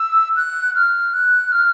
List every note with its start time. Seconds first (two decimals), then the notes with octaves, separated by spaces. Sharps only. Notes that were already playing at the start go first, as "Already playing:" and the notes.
Already playing: E6
0.36 F#6
0.76 F6
1.14 F#6
1.52 F6